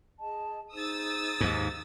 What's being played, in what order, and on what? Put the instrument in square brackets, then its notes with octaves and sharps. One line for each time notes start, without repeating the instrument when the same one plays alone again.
[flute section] G#4 D#5 A5
[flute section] D#4 G#4 C5 [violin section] D#6 E6 A6
[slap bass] D#2 G#2